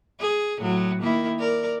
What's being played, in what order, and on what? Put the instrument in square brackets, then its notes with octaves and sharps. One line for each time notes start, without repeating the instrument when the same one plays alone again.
[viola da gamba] G#4
A2 F#3
D#3 A#3 E4
A#4 D5